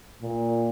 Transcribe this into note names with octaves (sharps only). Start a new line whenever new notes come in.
A#2